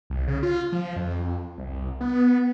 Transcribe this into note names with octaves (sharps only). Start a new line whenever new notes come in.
C2
C#3
F4
F3
F2
C2
B3